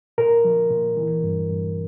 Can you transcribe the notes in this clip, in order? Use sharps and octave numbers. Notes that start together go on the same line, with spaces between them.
A#2 A#4
F3
A#2
E3
G2
G2